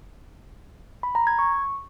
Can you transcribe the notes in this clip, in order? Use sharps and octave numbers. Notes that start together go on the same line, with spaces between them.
B5
A#5
G#6
C#6